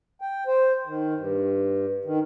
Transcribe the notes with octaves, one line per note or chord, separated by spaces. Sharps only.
G5
C5
D#3
G2
D#3